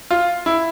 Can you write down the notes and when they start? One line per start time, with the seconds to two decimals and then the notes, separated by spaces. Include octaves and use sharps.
0.11 F4
0.46 E4